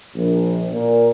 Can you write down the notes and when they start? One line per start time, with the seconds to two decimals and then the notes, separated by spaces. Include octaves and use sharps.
0.14 A#1
0.71 A#2